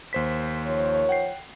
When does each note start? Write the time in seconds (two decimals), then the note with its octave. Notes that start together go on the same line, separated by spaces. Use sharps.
0.13 D#2 C5 B6
0.65 D#3 F3 C#5
1.09 F#5 G5 C7